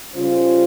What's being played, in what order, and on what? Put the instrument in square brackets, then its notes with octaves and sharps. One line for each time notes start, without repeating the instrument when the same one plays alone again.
[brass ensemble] C#3 G3 C#4 F4 C5